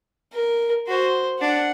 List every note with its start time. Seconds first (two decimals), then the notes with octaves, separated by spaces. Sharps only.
0.34 A#4
0.88 F#4 C5
1.40 D4 F#5